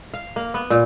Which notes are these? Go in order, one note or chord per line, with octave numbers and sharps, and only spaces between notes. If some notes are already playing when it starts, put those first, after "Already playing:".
F5
A#3
B3
A#2